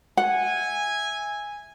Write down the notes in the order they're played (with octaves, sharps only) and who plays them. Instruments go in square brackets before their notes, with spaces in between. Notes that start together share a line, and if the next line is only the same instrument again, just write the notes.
[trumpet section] E5 G#5 [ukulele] F#5